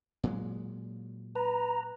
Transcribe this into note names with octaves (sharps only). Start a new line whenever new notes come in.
A#2 F#3 G#3
B4 A#5